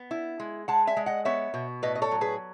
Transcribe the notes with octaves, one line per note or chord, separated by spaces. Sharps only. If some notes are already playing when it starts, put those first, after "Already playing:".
Already playing: B3
E4
G#3
G#3 F#5 A5
E5 G#5
G#3
D#5 F#5
B3 C#5 E5
B2
A2 B4 D#5
D#5
A4 C#5
F#3
G#4 B4